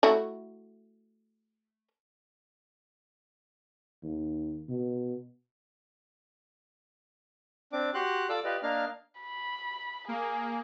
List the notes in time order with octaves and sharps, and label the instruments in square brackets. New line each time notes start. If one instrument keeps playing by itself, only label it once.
[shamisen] A3 E4 F#4
[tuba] D#2
B2
[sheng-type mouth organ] C4 D4 D6
F#4 G4 C6 F#6
F4 A4 D5 D6 E6
F4 G4 B4 D5 D#5
A#3 D4 D#5 F5 F6
[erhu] B5
[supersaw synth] A#3 [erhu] G#4